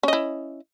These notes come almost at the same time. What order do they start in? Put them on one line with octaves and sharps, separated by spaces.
C#4 D#5 E4